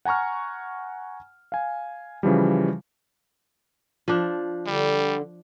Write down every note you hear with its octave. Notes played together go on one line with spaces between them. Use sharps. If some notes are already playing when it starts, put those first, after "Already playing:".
F#5 G#5 A#5 C#6 F6
F5 G#5
C#3 E3 F3 G3
F3 D4
D3 G3